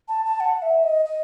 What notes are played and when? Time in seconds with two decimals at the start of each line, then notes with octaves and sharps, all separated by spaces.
0.08 A5
0.25 A5
0.40 F#5
0.62 E5
0.84 D#5
1.05 D#5